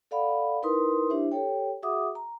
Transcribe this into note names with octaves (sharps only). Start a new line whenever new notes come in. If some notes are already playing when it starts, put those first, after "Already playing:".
A4 D5 F5 F#5 B5
D#4 E4 A#4 B4 C6 D#6
D4 E4 G4 C5 E5
G4 A4 C#5 G5
F#4 G#4 E5 F#5 D6 D#6
A#5